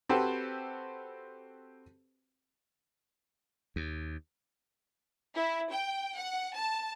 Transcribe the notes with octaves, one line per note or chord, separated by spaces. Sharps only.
C4 F#4 G4 A4 B4 C5
D#2
E4
G5
F#5
A5